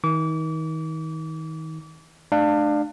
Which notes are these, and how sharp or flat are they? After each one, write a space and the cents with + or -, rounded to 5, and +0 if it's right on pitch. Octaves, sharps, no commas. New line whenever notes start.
D#3 +35 D6 -35
A3 -30 D4 +25 F5 +0